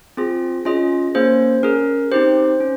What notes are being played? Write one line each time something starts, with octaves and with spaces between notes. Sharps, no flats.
C4 F4 G#4
C#4 F4 G#4 D#5
A#3 C#4 G#4 C5
C#4 G#4 A#4
C4 D#4 G4 C5
C#4